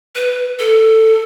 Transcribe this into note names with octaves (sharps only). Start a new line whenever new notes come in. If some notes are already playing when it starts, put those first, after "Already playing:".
B4
A4